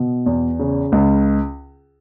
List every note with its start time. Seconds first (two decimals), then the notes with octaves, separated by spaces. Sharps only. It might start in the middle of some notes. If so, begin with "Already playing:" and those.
Already playing: B2
0.26 E2
0.59 C#3
0.92 C#2